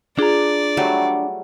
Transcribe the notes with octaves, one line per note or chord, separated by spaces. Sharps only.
D4 F4 G#4 D5 A#5
F#3 G3 A3